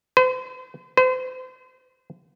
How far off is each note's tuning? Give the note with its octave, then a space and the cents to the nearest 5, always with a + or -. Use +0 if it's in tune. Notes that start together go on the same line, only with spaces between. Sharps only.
C5 -45
C5 -40